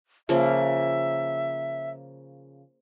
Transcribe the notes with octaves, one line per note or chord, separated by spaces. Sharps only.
C#3 F3 A#3 E5